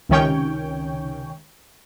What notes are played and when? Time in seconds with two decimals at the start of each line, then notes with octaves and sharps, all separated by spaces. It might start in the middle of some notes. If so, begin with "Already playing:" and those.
0.09 C#2 C3 D#3 C#4 C#5 G5